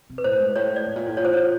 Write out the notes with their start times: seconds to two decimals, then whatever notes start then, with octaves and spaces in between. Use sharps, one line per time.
0.10 C3
0.18 B4
0.24 A2 C5
0.39 G#2
0.56 A2 C#5
0.76 D5
0.86 A2
0.96 A#2
1.06 A2
1.17 A#2 C#5
1.25 C5
1.33 C#5